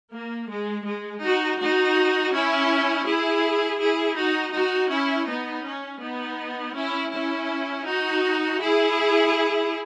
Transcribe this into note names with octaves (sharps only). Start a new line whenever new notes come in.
A#3
G#3
G#3
D#4 F#4
D#4 F#4
C#4 E4
E4 G#4
E4 G#4
D#4 F#4
D#4 F#4
C#4 E4
B3 D#4
C#4
B3 D#4
C#4 E4
C#4 E4
D#4 F#4
E4 G#4